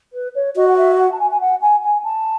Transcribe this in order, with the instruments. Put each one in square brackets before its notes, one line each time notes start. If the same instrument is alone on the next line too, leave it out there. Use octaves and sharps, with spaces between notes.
[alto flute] B4
C#5
[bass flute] F#4 [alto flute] D#5
[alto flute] F#5
E5
F#5
A5
G#5
G#5
F#5
G#5
G#5
A5